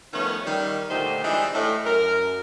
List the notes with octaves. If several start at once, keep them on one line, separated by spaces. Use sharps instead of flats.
D#3 F3 A3 B3 C#4
D#3 G3
A#2 D3 A3 D#4 G4 C5
E3 G3 G#3 D4 D#4
A2
F#2 A#4